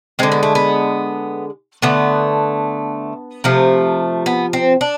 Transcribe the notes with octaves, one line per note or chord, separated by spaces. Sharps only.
D3 G#3 C4
B3
A3
B3
D3 A3 B3
C3 F3 A3
B3
C4
D4